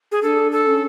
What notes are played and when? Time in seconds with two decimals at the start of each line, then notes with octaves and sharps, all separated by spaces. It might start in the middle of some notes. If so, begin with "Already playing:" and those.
0.12 G#4
0.23 D4 A4
0.52 A4
0.67 C#4